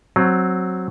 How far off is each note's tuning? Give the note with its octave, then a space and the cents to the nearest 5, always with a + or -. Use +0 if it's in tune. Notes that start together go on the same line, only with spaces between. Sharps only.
F#3 +0 C4 +10